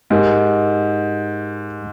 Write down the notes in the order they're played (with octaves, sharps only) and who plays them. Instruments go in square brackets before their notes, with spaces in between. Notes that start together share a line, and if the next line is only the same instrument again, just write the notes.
[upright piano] G#2 [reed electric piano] G#3 D#4 G4 A#4